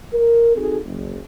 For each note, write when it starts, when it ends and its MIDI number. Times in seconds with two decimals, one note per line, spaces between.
0.13 0.54 70
0.56 0.77 60
0.56 0.77 63
0.56 0.77 66
0.56 0.77 68
0.56 0.77 69
0.85 1.18 30